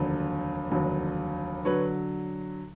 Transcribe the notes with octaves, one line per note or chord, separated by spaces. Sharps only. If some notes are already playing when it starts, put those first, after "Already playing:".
Already playing: F1 D#2 D3 F#3
F1 D#2 D3 F#3
D3 F#3 B4 C#5